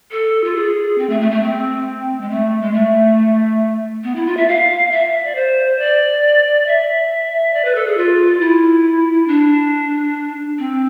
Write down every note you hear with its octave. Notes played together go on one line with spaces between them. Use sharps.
A4
F4
G#4
C4
A3
A3
A3
C4
G#3
A3
G#3
A3
B3
E4
F4
E5
F5
E5
D5
C5
D5
E5
D5
B4
A4
G#4
F4
E4
D4
C4